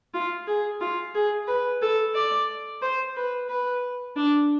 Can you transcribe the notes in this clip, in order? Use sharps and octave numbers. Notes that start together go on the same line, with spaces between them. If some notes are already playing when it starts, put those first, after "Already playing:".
F4
G#4
F4
G#4
B4
A4
D5
C5
B4
B4
D4